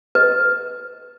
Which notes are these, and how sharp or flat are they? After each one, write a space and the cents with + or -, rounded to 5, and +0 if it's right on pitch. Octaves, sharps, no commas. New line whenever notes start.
B4 +0 D#5 +20